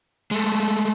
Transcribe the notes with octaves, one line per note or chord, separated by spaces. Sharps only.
G#3 A3